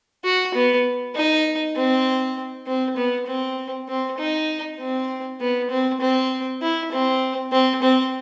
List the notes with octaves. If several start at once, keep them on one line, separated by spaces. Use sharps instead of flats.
F#4
B3
D#4
C4
C4
B3
C4
C4
D#4
C4
B3
C4
C4
E4
C4
C4
C4